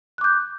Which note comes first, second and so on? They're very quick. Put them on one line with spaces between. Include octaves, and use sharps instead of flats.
F#6 D6 G6